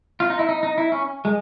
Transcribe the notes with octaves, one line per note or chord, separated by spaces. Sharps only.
F4
D#4
E4
D#4
D#4
E4
C#4
G#3